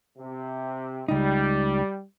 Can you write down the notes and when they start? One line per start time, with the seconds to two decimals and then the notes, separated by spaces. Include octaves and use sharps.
0.18 C3
1.08 C#2 G3 D#4